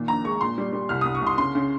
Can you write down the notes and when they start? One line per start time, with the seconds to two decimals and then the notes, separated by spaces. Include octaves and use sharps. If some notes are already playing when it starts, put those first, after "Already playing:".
Already playing: A#2 D#3
0.08 A#1 A#5
0.24 G#3 C#6
0.41 A#2 C6
0.58 G3
0.73 G3
0.89 C2 F6
1.01 D#6
1.05 C2
1.15 C#6
1.22 C2 C6
1.38 C#3 C6
1.55 C#3